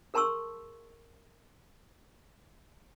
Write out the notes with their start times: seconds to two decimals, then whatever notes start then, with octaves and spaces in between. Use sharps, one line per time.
0.14 G#4 A#4 A5 C6 C#6 E6